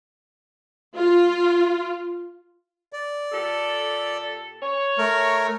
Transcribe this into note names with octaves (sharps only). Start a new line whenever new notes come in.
F4
D5
A#2 G4 A4
C#5
A3 A#4